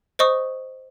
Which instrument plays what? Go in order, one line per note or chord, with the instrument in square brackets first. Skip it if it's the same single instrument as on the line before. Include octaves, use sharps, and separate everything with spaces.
[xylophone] C5 D#5 C#6 D#6